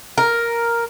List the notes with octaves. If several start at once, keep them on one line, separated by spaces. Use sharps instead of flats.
A#4